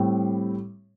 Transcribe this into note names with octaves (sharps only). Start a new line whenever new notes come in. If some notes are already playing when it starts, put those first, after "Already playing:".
Already playing: A2 G3 C4